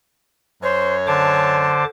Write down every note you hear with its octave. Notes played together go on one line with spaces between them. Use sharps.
F#2 C5 C#5
D3 C5 A5 D6